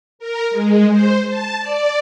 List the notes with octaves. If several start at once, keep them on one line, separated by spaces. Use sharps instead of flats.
A#4
G#3
C5
A5
D5